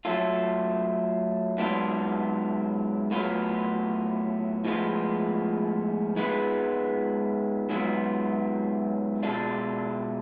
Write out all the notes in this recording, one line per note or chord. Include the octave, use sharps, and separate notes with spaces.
F#3 A3 F4 A4
G#2 F#3 B3 D4 F4
A2 F#3 B3 F4
A2 F3 G#3 B3 F4
G#2 G#3 B3 F4 B4
G#2 F#3 B3 F4
B2 G#3 D4 F4 A4